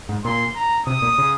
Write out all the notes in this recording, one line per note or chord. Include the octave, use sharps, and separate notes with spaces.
G#2
A#2 C6
A#5
C3 D#6
A#2
C#3